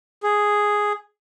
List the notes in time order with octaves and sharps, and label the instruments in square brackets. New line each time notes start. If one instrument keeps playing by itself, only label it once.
[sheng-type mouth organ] G#4